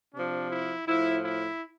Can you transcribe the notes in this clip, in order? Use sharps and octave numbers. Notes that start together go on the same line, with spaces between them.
C3 F3 D4
E4
A2 F3 E4
E4